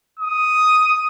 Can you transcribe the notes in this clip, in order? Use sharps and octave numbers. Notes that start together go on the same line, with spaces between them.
D#6